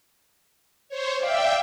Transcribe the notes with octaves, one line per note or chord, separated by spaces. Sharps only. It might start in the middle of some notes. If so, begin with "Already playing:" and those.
C5 C#5
D5 E5 F5 G5